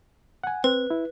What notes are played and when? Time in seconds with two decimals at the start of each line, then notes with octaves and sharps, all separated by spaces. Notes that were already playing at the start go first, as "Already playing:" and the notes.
0.44 F#5 G#5
0.64 C4 B4
0.90 E4